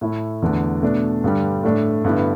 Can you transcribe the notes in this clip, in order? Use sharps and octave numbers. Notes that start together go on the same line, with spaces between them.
A2 A3 E4
E2 D3 A3
B2 A3 D4
G2 D3 G3
A2 A3 D4
G2 D3 B3 E4